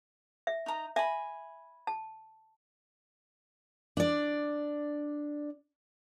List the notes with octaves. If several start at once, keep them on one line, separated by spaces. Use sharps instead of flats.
E5
D#4 A#5
E5 G#5 B5
A5
D4 D5